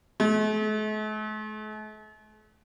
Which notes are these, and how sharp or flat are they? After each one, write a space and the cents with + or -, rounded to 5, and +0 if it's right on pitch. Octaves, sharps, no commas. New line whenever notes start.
A3 -45